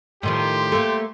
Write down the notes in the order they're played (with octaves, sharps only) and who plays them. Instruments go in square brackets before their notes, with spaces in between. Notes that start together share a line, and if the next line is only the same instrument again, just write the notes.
[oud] A2 D#3 F3 [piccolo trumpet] G4 [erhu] C6
[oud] A3 A#3